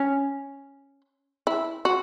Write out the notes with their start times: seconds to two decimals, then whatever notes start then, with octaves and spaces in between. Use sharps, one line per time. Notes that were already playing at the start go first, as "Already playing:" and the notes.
Already playing: C#4
1.47 E4
1.85 F#4